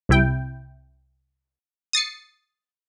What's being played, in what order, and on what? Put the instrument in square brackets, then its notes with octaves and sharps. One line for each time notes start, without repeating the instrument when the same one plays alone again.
[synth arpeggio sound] C2 C3 E4 G5
D#6 A6 C7 C#7